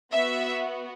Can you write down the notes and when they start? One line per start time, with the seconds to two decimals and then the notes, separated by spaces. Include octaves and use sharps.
0.13 B3 F#4 E5